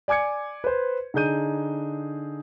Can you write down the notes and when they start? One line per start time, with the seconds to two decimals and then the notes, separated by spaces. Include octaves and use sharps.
0.08 D5 G#5 D6 G#6 C#7
0.64 B4 C5
1.14 D3 D#4 G#4 G6 D#7